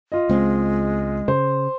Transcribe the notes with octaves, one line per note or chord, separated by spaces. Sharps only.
F4 D#5
C#2 G#3 C4
C#3 C5